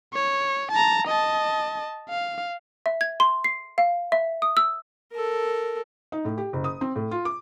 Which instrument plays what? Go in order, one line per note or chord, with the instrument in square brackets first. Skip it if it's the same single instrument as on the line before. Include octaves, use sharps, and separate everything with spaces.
[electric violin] C#5
A5 A#5
D#5 A5
F5
[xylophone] E5
G#6
C6
C7
F5
E5
D#6
E6
[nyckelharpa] A4 A#4
[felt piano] D#4
A2
G4
F#1
D#6
C4
A2
F4
D6